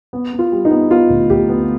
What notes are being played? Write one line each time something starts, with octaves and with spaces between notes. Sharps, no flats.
B3
B3
F4
G3
D#4
B3
B3 F4
D2
D2 G4
B3